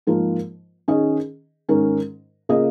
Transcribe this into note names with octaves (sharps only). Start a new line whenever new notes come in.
G#2 F3 A#3 F4 A#4
D#3 C#4 G#4 D#5
G#2 D#3 C#4 A#4
C#3 A#3 F4 G#4 D#5